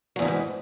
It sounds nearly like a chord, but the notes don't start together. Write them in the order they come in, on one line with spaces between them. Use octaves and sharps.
F#3 E2 E3 B2 G#2